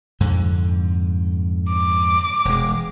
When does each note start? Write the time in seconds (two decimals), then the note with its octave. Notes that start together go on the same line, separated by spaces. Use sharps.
0.20 F2 G#2 D3
1.72 D6
2.45 E1 G#3